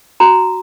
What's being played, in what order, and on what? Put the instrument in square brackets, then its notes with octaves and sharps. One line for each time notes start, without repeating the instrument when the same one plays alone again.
[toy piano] F#4 A#5